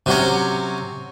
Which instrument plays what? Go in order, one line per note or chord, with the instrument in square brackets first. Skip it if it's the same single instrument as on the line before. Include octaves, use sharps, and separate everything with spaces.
[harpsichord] C3 F#3 C#4